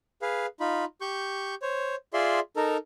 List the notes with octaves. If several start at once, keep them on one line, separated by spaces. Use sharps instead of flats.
G#4 B4 F5
D#4 F4 B5
G4 C#6 G6
C5 C#5
F4 G#4 D5 E5 C6
D#4 A4 A#4